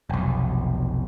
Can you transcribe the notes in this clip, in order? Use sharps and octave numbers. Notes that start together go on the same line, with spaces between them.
F1 B1